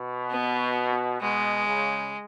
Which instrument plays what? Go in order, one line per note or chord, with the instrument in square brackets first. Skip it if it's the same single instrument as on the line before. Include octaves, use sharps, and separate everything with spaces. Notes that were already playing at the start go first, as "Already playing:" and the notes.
Already playing: [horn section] B2
[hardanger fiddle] B3
[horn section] B2 [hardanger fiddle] G#3
[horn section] C#3